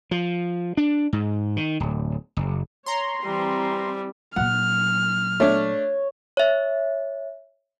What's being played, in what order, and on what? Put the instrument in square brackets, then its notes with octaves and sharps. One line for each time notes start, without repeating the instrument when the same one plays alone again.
[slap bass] F3
D4
G#2
D#3
D1
F#1
[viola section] C#5 [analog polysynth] A#5 C6
[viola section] E3 C4 [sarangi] G3
[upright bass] A#2 F#3 [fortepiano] F#5 [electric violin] F6
[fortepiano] A3 D4 [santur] C#5
[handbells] C#5 E5